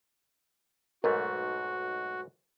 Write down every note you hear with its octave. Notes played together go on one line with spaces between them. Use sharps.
B1 G#2 A3 F#4 A#4